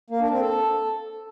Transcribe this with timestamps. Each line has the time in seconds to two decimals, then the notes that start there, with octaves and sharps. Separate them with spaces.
0.10 A#3
0.21 D4
0.31 C4
0.41 A4